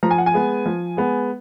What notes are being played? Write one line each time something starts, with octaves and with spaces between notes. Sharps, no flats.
F3 A#5
G#5
F#5
G#5
G#3 B3
F3
G#3 B3